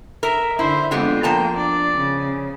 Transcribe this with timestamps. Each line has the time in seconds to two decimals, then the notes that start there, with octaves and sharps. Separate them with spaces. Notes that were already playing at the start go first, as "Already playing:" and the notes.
0.23 A#4 E5
0.59 D3 E4 C5 E5
0.91 F2 D3 G#3 B3 C4 F4 G4
1.23 F3 A#3 G5 A5 A#5
1.56 D4 D5
1.97 C#3